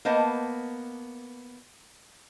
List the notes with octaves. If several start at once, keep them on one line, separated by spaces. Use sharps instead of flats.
A#3 B3 C5 D#5 A5